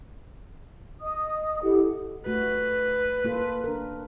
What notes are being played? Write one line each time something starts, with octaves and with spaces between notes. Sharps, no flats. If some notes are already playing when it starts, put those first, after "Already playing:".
D#5 D#6
E4 G4 A4 F#5
A3 F#4 B4
A#3 F4 A4
D4 A#4